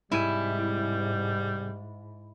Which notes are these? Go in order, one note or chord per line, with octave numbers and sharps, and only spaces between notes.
C2 G#2 G3 G#3 E4 G#5